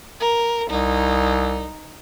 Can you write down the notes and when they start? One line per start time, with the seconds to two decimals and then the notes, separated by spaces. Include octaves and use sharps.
0.20 A#4
0.70 C2 D#4